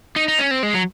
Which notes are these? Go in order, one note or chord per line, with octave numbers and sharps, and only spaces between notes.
D#4
D#4
C#4
C4
G#3
F#3